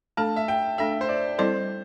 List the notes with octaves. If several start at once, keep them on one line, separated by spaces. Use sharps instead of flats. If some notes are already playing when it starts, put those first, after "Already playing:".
A3 D4 A4 A5
E5
G5
A3 D4 A4 E5
C5
D5
G3 C4 E4 A4 C5 D5